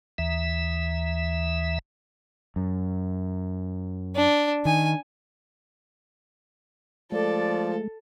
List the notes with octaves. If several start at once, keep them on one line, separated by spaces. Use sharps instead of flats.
D#2 E3 E5
F#2
D4
D#3 G#5
F3 G#3 A3 A4 D5